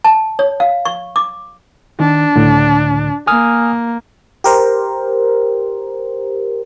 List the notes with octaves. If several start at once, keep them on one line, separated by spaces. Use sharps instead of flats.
A5
C#5
F5
C#6
D6
D#3 D4
C#2 A2 D3
A#3 G#5 D#6 F6
G4 A#4 C5